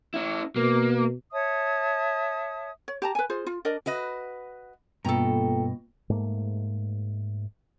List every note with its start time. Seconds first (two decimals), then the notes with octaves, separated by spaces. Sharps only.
0.14 C#4 E4
0.56 B2 A#3
1.32 C#5 E5 A5 D#6
2.88 C#5
3.02 G4 A5 A#5
3.15 B4 G#5
3.30 F4 G#4 C5
3.47 F4
3.65 D4 A#4 D5 D#5
3.86 F#4 B4 D#5
5.05 G2 B2 A#3 F4 A4 G5 A#5
6.10 G#2 A3 A#3